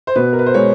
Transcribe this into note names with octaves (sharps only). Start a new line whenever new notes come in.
C5
B2 B4
A#4
B4
C5
G#3 C#5